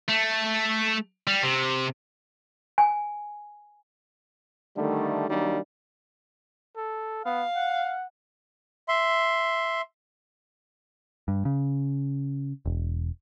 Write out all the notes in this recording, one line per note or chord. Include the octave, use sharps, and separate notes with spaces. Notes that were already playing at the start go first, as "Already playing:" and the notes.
A3
G3
C3
G#5
D3 D#3 G3 A3
D#3 F#3 G3 A#3 D4
A4
B3 F5
F#5
E5 C6
G2
C#3
E1